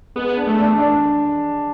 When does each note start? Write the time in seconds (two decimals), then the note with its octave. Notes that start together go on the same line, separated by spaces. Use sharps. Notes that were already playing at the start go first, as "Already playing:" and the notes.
0.16 G#3 B3
0.37 D4
0.47 A3
0.58 D4
0.79 D4